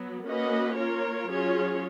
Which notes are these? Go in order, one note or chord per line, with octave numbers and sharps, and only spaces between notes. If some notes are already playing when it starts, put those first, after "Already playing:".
Already playing: F#3 B3
A#3 C#4 F#4 B4 D#5
A#3 F4 A#4 C#5
F#3 C#4 F4 G#4 C#5